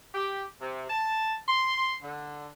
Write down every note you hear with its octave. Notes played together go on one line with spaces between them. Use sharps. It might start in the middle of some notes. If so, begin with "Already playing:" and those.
G4
C3
A5
C6
D3